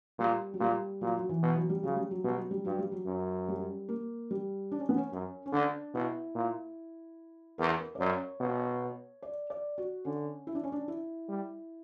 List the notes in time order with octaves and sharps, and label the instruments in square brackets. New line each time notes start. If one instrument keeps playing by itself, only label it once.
[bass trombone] A#2 [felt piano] G3
[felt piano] F#3
[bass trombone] A#2 [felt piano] G3
[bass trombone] A#2 [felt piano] F#3
[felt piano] F#3
E3
[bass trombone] B2
[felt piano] F#3
G3
[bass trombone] C#3 [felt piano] F#3
[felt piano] G3
F#3
[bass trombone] B2 [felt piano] G3
[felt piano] F#3
G3
[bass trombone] G2 [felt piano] F#3
[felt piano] G3
F#3
[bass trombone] F#2
[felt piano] G3
A#3
G3
D4
C#4
B3
C#4
[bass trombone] F#2 [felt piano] C#4
[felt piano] C#4
[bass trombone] D3 [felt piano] D4
[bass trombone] B2 [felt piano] E4
[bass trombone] A#2
[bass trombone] E2 [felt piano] A#4
[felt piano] B4
A#4
D5
[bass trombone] F#2 [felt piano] C#5
[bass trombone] B2
[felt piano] D5
D5
F#4
[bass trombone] D3 [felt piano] C#4
[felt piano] E4
D4
C#4
D4
E4
[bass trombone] G3